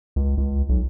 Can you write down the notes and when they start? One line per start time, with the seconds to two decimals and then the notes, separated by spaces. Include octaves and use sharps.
0.16 C#2
0.38 C#2
0.69 B1